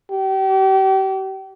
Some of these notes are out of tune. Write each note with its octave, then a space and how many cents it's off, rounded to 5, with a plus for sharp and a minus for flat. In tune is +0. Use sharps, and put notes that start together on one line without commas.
G4 -35